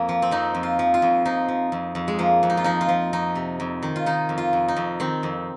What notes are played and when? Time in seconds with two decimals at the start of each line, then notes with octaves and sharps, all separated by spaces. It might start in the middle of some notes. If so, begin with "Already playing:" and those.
Already playing: F2 A#3
0.09 F3
0.22 C4
0.31 F2 D#4
0.55 F2
0.63 F4
0.79 F3
0.94 F4
1.02 F2
1.25 F3 D#4
1.48 F3
1.72 F2
1.95 F2
2.08 G#3
2.19 F3 A#3
2.43 F2
2.50 D#4
2.57 F4
2.64 F3 D#4
2.81 F4
2.89 F3
3.13 F2 D#4
3.35 C3
3.60 F2
3.83 D#3
3.96 F4
4.06 D#3 D#4
4.29 F2
4.38 F4
4.53 F2
4.68 D#4
4.76 F2
5.00 D#3 C4
5.23 F2